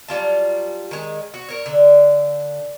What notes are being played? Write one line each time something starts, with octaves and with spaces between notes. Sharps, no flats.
F#3 G3 F4 A5
D#3 G#3
F#4
A#4 C#5
D3